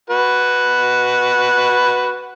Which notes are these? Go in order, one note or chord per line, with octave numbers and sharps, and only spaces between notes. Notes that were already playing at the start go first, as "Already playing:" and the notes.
F#4 B4